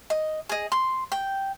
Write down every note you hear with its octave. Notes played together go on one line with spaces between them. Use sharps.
D#5
G#4 D#5
C6
G5